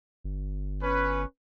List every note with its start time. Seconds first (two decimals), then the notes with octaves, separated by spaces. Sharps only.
0.24 G1
0.83 C#4 B4